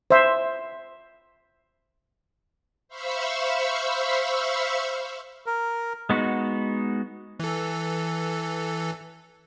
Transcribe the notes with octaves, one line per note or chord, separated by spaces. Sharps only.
C5 E5
C5 E5 F5 B5 C#6 E6
A#4
G#3 B3 D#4 F#4
E3 A4